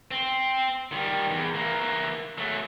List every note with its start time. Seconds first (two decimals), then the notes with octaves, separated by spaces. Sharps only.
0.11 C4
0.92 D#3 G3
1.31 E2
1.54 E3 A#3
2.38 F#3 A3